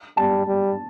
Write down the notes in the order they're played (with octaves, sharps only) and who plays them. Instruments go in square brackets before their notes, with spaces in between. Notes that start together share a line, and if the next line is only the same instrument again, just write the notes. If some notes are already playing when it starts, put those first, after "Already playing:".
[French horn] G3 [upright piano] A5
[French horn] G3